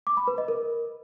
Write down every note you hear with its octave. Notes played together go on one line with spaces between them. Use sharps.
D6
B5
B4
D#5
A#4